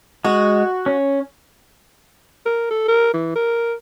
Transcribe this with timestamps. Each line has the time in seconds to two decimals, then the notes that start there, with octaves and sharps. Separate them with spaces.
0.25 G#3 F#4
0.86 C#4
2.46 A#4
2.71 A4
2.88 A#4
3.14 E3
3.35 A#4